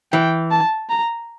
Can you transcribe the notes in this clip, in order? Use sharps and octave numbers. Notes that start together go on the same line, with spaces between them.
E3 G5
A5
A#5